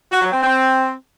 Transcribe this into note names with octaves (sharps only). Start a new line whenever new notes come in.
F#4
F#3
C4
C4